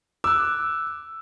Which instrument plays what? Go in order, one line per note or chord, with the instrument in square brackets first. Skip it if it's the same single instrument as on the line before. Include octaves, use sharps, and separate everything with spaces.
[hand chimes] D6 F#6 [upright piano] E6